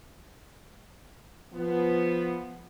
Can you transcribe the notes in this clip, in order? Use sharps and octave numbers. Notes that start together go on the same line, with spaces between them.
F3 B3